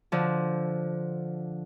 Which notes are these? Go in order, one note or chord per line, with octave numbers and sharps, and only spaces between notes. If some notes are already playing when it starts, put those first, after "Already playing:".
D3 F3